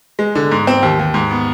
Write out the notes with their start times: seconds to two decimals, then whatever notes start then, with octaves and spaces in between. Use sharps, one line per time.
0.19 G#3
0.35 D3
0.52 G#2
0.67 C4
0.83 D#2
0.99 D#2
1.14 G#2
1.31 B3